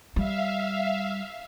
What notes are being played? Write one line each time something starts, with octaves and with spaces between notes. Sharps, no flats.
G3 E5 F5